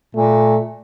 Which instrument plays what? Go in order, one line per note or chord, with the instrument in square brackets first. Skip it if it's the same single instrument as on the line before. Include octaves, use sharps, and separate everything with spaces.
[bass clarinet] A#2 [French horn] A3